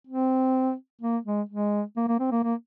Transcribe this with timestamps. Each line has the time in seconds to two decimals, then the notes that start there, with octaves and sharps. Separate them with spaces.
0.07 C4
1.01 A#3
1.25 G#3
1.49 G#3
1.97 A#3
2.08 A#3
2.19 C4
2.31 A#3
2.43 A#3